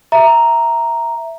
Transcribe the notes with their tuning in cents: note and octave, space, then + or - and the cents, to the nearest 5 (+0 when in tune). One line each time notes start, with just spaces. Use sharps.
E5 +0 A#5 +0